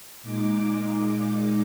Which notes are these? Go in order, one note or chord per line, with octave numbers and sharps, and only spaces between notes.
A#2 G#3 D#4 D6